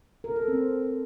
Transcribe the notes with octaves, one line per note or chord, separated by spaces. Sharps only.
A#4
A4
C4